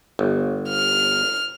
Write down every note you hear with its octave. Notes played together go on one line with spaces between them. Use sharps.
G1
F6